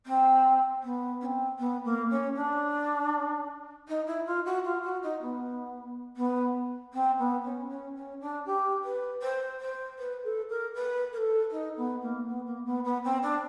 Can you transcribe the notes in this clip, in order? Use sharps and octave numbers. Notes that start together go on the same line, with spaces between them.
C4
B3
C#4
C4
B3
A#3
C#4
D4
D#4
E4
F4
F#4
F4
F#4
D#4
B3
B3
C4
B3
C#4
C#4
C#4
D4
G4
B4
C5
C5
B4
A4
A#4
B4
A#4
A4
D#4
B3
A#3
B3
A#3
B3
B3
C4
D4